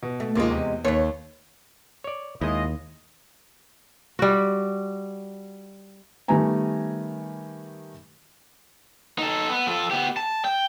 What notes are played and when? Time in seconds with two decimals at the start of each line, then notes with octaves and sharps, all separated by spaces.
0.02 B2
0.20 A3
0.35 D#2 C3 G#3 A#3 F4
0.51 E2
0.85 D#2 B4 C#5
2.04 C#5 D5
2.41 D#2 G#3 E4 F4 D#5
4.19 G3 F#4
6.28 D#3 G3 A3 B3 G#5 A#5
9.18 D#4 A4
9.50 B3
9.67 F3 A4
9.91 B3 G4
10.17 A5
10.45 G5